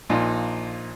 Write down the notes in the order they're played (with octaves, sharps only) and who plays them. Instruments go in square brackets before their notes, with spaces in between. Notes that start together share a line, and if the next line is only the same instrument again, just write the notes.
[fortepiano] A#1 A#2 D#4